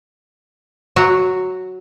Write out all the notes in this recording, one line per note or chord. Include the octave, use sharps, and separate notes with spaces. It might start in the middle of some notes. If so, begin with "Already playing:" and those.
F#3 F#4